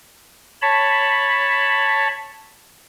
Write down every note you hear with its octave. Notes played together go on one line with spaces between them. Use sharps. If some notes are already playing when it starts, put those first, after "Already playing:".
C#5 A5 B5